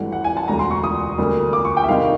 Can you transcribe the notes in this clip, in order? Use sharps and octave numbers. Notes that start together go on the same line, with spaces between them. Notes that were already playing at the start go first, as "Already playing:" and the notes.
Already playing: G#1 G2 E3 A3 F#5
F#5
G#5
A5
E1 D2 D3 G3 A#5
C6
C#6
D#6
D2 D3 G3 A#3
D6
C#6
G5
E5
C2 C3 D#3 G#3 F5